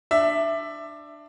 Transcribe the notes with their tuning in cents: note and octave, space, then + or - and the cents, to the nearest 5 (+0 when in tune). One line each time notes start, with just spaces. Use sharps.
D4 +15 E5 +10